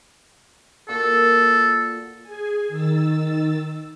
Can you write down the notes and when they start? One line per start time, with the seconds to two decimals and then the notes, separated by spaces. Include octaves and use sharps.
0.88 A#2 F#4 A4
2.23 G#4 G#5
2.68 D#3 E6 A6